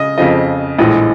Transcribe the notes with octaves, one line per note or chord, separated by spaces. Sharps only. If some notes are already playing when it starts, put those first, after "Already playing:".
Already playing: C#3 D#5
F2 C#3 F3 D#5
A#1 A2 E3 G#3 D#5